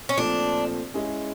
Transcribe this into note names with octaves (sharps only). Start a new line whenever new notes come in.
C#4
A#2 F3 A3 C4 D4
G#3 C#4 E4 G#4